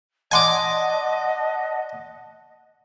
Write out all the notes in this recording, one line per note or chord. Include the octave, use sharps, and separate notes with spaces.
D5 D#5 F#5 G#5 A5 C6 D6